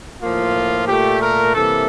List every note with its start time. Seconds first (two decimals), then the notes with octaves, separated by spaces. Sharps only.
0.20 A2 F3 A#3 F4
0.87 A#2 A3 G4
1.21 A#4
1.54 C3 E3 G3 A#3 A4